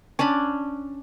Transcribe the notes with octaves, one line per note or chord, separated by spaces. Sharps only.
C#4 D4 A5 B5